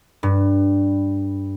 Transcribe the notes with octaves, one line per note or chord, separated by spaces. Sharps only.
G2